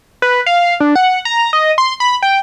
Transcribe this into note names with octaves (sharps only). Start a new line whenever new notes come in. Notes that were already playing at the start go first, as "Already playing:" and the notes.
B4
F5
D4
F#5
A#5
D#5
C6
B5
G5